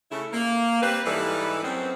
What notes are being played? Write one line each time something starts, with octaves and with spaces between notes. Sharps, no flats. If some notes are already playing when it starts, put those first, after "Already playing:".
C#3 A3 E4
A#3
G3 C4 G4 B4
G#2 E3 G3 E4 A4 B4
F#2 B3 C4